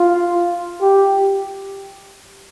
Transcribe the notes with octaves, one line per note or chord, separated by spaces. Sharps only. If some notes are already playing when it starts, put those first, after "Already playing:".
Already playing: F4
G4